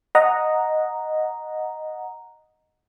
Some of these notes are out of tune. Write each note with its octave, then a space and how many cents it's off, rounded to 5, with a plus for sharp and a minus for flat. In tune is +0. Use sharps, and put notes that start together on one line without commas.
D#5 +0 F#5 -10 A#5 +0